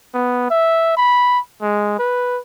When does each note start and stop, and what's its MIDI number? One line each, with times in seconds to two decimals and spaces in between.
0.14 0.49 59
0.51 0.96 76
0.97 1.39 83
1.62 1.95 56
1.99 2.40 71